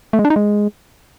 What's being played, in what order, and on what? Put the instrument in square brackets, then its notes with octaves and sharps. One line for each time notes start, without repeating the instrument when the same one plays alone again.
[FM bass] A3
G#3
D4
D#4
G#3